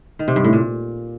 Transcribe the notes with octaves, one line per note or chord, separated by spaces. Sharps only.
D#3
C3
G2
A2
A#2